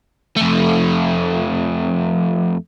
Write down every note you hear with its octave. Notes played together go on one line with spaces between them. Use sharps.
F2 A3